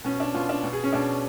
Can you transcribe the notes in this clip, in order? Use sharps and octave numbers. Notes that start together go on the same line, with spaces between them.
B2 C#4
D4
B2 F4
D4
B2
G#4
C#4
B2 D4